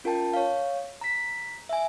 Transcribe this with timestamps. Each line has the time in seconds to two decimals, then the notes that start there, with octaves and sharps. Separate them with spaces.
0.04 C#4 F4 A#4 G5 A5
0.34 C#5 F5
1.01 A#5 B6
1.69 E5 G#5